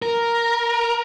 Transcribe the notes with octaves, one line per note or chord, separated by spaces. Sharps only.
A#4